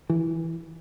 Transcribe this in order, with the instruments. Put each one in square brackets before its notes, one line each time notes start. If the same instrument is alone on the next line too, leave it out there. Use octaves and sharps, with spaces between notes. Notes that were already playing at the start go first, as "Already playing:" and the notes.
[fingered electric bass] E3